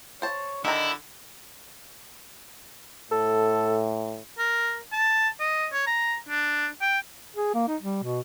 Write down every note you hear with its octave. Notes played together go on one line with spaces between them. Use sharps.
C5 C#5 A5
D3 D#3 D#4 E4 A#5
A2 A4
A#4
A5
D#5
C#5
A#5
D4
G5
G#4
A#3
D#4
G3
B2